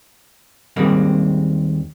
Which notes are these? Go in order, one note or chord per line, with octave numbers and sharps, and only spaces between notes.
D#2 G3 G#3 A#3 C4